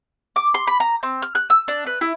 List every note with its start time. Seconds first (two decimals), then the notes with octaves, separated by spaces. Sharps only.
0.36 D6
0.54 C6
0.67 B5
0.80 A#5
1.03 C4
1.22 F6
1.35 F#6
1.50 E6
1.68 D4
1.86 B4
2.01 E4